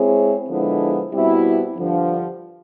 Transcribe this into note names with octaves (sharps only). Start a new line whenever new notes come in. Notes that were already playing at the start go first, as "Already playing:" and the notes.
Already playing: G#3 C4 E4 G#4 C#5
D3 F3 G#3 B3 E4
B2 G3 C4 E4
G2 D3 F3